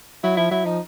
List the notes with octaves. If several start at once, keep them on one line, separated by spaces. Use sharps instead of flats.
F#3 E4
F3 E4
F#3 E4
F3 D#4